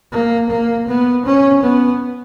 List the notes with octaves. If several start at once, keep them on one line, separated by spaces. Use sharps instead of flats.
A#3
A#3
B3
C#4
B3